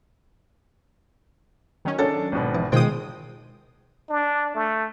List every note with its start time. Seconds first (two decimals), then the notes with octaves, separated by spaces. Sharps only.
1.85 D#3 F#3 C#4
1.99 D4 A4 A#4 C#5 F#5 A6
2.32 G#1 B2
2.55 E3
2.72 B2 D#3 G#3 C4 F4 G5 D#6
4.10 D4
4.55 A3